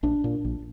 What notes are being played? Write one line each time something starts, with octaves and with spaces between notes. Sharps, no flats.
A#1 D4
A#2
A#1